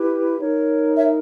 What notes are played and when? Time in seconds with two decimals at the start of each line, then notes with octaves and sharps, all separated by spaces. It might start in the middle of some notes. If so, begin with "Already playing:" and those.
Already playing: E4 G4 B4
0.40 D#4 A#4 C#5
0.96 C#5 E5